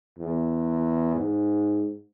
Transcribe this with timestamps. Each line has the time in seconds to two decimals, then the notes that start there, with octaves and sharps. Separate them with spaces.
0.19 E2
1.15 G#2